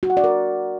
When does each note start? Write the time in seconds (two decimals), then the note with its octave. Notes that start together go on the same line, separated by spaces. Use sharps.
0.03 F#4
0.10 F#5
0.17 D5
0.24 A#4